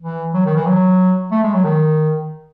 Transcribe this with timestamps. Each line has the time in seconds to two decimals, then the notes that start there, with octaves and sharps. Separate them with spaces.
0.01 E3
0.34 F#3
0.45 D#3
0.56 E3
0.66 F#3
1.32 A3
1.43 G#3
1.54 F#3
1.64 D#3